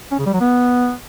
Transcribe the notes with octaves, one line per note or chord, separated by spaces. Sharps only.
C#4
C#3
G3
F#3
B3